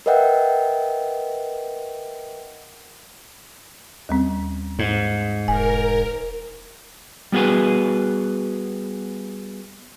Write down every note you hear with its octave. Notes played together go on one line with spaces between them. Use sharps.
A#4 B4 D#5 E5 F#5 G5
D#2 G3 C4
G#2
E1 A#4 G#5
G3 B3 F#4 G#4 B4